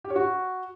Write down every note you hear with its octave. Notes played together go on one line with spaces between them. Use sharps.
G4
C#5
F#4